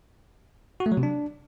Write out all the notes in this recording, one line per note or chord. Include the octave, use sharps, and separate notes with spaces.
F#4
A3
F#3
C3
D4